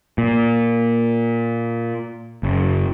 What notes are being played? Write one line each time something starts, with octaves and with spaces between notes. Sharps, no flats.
A#2
F#1